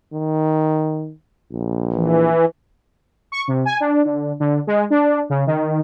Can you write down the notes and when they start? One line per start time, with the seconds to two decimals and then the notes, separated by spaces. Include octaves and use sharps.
0.13 D#3
1.52 A#1
1.93 E3
3.32 C#6
3.48 C3
3.65 G#5
3.80 D4
4.05 D3
4.40 D3
4.67 G#3
4.90 D4
5.30 C#3
5.47 D#3